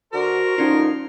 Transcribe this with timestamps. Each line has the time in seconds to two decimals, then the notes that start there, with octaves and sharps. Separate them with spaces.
0.13 D3 F#4 A#4 C5
0.58 D3 D#3 F3 C#4 D#4 F4